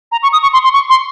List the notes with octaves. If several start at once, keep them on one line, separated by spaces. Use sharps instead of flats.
A#5
C#6
D#6
C#6
C6
C6
C#6
C6